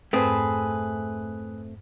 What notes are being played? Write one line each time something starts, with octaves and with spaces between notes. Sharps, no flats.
F2 G#2 A3 C4 G#4 B4